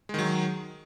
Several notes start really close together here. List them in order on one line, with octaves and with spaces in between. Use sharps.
G#3 D#3 F#3